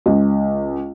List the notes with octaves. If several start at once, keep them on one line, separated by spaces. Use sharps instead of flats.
C#2